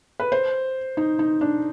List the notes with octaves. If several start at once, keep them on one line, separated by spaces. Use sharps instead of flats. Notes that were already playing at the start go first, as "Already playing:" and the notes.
B4
C5
D#4
D#4
D4